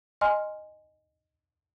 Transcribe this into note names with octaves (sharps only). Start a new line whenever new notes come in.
D#5 G#5 C6 F6